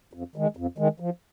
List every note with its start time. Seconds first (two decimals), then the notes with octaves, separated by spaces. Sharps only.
0.13 F2
0.36 D#3 G#3
0.57 F2
0.78 D#3 G#3
1.00 F3